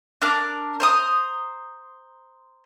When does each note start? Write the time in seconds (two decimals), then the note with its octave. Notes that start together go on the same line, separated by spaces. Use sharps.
0.22 D4 A#4 D6
0.80 C5 A#5 D#6